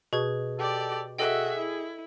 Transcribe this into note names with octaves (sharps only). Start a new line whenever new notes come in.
B2 G#4 B4 G#6
G4 A4 D5
F#4 G#4 A4 D#5 E5 G5
E4